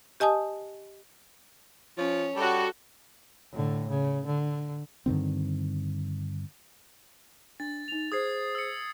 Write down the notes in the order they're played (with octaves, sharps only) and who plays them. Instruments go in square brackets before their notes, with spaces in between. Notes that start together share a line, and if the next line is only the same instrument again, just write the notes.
[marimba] G4 D#5 G#5 A5 D#6
[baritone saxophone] F3 [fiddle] C#4 C#5
[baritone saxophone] G3 [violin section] F#4 A4
[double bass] A2 D3
C#3
D3
[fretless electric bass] G2 D3 D#3 C4
[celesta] D4 [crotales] A6
[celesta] D#4 F7
[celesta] G#4 C5 [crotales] D#6 G#6 C7
[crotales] E6 C#7